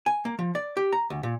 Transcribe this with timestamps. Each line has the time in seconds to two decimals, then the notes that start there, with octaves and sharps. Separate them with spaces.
0.06 G#5
0.25 A#3
0.39 F3
0.55 D5
0.77 G4
0.92 A#5
1.10 D2
1.23 A#2